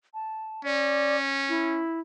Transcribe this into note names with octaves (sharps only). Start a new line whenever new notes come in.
A5
C#4 D5
E4